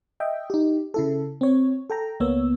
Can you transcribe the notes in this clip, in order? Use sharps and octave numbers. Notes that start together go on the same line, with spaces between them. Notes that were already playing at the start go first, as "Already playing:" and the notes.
D#5 E5 G5
D#4 G4
C#3 E4 A4
C4 C#5
A4 G5 A#5
C#2 A#3 B3 C#5 E6